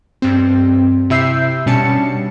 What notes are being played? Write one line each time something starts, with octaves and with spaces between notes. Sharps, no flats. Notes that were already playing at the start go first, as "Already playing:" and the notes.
G2 C4
C3 E4 E5 E6 G6 C7
B2 G3 C#4 D4 A5 C#7